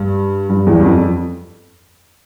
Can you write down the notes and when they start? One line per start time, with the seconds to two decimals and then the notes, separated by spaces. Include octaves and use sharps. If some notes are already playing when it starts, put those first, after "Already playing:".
Already playing: G2
0.49 G2
0.67 E2
0.79 G2
0.85 F2